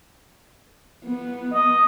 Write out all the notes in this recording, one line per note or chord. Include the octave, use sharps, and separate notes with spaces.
B3
D#5